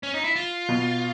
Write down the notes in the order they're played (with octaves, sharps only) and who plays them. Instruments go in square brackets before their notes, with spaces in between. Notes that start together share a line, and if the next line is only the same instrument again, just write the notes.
[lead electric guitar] C#4
D#4
E4
F4
[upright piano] B2